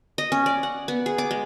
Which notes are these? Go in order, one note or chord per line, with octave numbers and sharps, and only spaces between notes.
D#5
C#4
D5
F#5
B3
G#4
D6
G#3